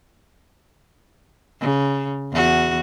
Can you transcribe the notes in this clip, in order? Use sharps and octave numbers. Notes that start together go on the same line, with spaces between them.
C#3
E2 F#4